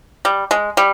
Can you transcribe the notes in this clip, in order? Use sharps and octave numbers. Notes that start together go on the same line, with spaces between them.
G3
G#3
G3